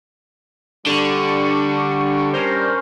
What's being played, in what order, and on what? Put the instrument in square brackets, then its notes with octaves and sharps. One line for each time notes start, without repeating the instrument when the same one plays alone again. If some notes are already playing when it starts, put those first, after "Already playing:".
[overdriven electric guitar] D3 [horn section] G3 D4 [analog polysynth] C#6
[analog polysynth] C#4 A#4 C5